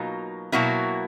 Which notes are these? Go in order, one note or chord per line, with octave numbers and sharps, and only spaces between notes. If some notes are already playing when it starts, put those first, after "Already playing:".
Already playing: B2 F#3 A#3 D#4 F4
B2 F#3 A#3 E4 F#4